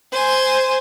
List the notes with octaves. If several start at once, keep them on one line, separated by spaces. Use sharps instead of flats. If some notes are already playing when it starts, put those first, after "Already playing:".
C5 G#5